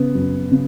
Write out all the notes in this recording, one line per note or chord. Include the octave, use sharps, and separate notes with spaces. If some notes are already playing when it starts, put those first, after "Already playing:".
Already playing: C#3 B3
F#2
C#3